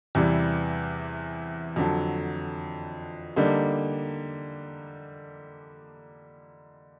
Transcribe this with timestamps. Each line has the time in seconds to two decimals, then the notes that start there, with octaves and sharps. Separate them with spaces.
0.15 E2 C3 E3 G3
1.76 F2 D3 F#3
3.36 D3 G3 A#3 D#4